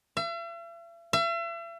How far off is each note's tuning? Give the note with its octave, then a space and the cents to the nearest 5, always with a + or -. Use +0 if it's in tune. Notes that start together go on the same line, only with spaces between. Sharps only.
E5 +45
E5 +40